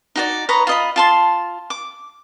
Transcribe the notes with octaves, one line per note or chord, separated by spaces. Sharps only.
D#4 F#4 D5
B4 C#5 D#5 A#5
F4 D#5 B5
F4 A5 C6
D6